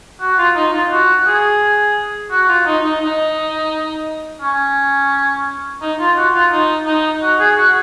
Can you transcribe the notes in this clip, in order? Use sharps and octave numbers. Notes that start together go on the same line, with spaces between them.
F#4
F4
D#4
F4
F#4
G#4
F#4
F4
D#4
D#4
D#4
C#4
D#4
F4
F#4
F4
D#4
D#4
F#4
G#4
F#4